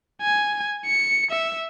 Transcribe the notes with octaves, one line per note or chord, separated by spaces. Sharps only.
G#5
C#7
E5